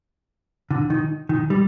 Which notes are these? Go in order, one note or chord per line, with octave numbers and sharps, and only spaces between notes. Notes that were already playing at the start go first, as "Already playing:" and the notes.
D3
D#3
D#3
G3